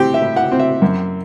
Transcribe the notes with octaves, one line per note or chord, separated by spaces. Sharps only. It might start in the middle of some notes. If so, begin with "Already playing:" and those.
Already playing: A2 C4 G4
E5
A2
F#5
C4
E5
F#2